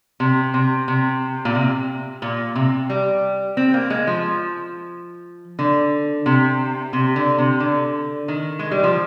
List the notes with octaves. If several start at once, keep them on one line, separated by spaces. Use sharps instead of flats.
C3
C3
C3
A#2
C3
A#2
C3
G3
C4
A#3
G#3
F3
D3
C3
C3
D3
C3
D3
D#3
G#3
G3
F3